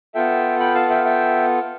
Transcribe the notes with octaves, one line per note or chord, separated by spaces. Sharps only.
B3 F4 A4 E5 G5
G5 B5
F5 A5
E5 G5
E5 G5